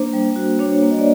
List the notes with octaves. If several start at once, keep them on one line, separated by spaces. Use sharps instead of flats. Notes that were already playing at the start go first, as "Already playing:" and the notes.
Already playing: A#3 D4 C5
G3
F#4
D4 C#5
A#3
D#5
D5